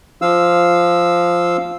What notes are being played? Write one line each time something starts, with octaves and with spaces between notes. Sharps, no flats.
F3 F5 E6